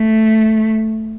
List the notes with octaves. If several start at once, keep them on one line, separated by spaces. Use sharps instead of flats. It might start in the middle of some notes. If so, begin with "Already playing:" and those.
Already playing: A3